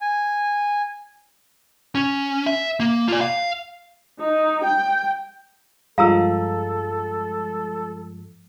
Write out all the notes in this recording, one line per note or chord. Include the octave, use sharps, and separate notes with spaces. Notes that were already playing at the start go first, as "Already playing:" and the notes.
G#5
C#4
E5
A#3
F4 D5
F5
D#4
G5
G2 F3 G#3 A4 F5 A#5 E6